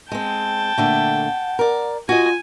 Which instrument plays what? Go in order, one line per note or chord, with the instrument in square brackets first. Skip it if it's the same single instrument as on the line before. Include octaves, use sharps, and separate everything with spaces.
[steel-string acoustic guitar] G#3 C4 [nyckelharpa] G5 A5
[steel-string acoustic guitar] A#2 D3 A3 [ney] F#5
[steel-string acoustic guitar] A#4 D5
[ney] F4 [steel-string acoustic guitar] F#4 D#5 [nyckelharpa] G#5